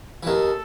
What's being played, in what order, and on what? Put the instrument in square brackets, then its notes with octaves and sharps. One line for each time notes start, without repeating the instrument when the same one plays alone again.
[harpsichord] E3
[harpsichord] D#2 D#3 [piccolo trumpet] A4